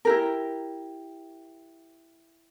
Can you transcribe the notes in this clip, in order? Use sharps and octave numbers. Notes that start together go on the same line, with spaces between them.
E4 G4 A#4